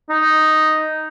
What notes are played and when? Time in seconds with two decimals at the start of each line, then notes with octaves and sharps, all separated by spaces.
0.10 D#4